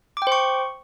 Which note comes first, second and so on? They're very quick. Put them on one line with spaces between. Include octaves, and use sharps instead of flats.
D6 G5 C5 C#6